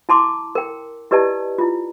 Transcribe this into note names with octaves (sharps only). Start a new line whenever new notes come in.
E4 A5 C6 D6
A#4 G5
E4 G4 B4 D5 D#5 A5
E4 F4